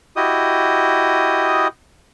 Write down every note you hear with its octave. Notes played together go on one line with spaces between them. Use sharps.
E4 F#4 G4 D#5 D#6